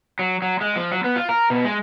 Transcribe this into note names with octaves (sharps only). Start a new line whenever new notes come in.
F#3
F#3
G#3
F3
F#3
B3
F4
A#4
B2
G#3